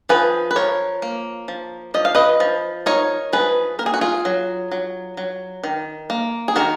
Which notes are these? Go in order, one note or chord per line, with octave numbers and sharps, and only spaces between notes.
F3 G#4 B4
B4
F3 A#4 C#5
A#3
F3
F3 D#5
F5
B4 D#5
F3
D#4 A#4 C#5
F3 G#4 B4
A#3 A#4
G#4
F#4
F4 G#4
F#3
F#3
F#3
D#3
A#3
G#4
D#3 F#4 A#4